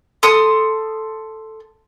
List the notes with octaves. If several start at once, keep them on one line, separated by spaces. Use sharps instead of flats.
A4 C6 D#6